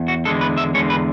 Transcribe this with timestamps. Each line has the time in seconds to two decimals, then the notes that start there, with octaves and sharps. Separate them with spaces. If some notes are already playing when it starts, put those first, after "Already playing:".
Already playing: E2
0.08 F#4
0.25 E2 D3 G#3 A4
0.41 B4
0.57 E5
0.74 E2 D3 G#3 C#5
0.90 B4